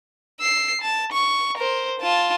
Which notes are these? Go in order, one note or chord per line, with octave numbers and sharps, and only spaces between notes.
E6 C7
A5
C#6
A#4 C5
F4 A5